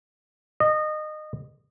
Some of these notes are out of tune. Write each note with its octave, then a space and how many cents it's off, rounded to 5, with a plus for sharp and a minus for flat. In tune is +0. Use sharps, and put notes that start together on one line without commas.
D#5 -25